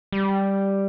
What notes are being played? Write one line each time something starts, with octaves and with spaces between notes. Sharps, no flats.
G3